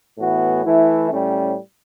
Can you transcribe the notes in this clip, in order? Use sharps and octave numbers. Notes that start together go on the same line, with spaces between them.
A2 E3 B3 F#4
E3 A3 E4
A2 G3 C#4